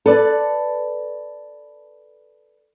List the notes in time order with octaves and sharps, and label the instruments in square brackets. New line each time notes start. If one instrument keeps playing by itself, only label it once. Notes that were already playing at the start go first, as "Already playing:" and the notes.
[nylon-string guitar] A4 B4 D5